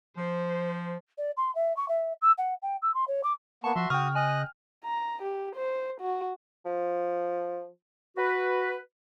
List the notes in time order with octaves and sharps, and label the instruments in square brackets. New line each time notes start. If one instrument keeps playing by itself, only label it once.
[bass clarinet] F3 [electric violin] C5
[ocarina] D5
C6
E5
C#6
E5
E6
F#5
G5
E6
C6
C#5
D6
[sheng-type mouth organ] A#3 B3 C#6 [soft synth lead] A5
[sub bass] F3 [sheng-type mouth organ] F#4 E5 C6
[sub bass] C#3 [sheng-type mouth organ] F#4 D#6 [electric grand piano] G5 F6 [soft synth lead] C#6
[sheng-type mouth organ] D#5 F#6 [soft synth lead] G#5
[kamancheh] A#5
G4
C5
F#4
[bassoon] F3
[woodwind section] F#4 B4